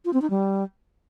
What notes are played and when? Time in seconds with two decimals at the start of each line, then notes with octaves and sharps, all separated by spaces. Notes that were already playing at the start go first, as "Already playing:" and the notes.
0.05 F4
0.13 C4
0.22 D#4
0.30 G3